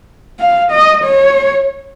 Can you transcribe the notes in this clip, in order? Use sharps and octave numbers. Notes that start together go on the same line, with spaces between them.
F5
D#5
C#5